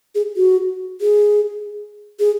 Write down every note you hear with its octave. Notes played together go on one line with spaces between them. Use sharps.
G#4
F#4
G#4
G#4